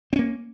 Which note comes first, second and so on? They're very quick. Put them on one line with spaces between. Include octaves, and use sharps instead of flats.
C4 C#4 A#3